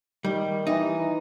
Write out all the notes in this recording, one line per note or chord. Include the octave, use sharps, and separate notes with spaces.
D#3 G3
E3 D#4